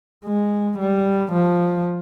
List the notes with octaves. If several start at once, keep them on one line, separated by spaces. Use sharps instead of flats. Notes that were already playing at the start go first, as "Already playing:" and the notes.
G#3
G3
F3